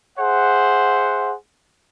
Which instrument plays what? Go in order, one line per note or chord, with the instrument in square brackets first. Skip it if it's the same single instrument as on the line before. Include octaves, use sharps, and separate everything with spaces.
[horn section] G#4 C5 E5 F#5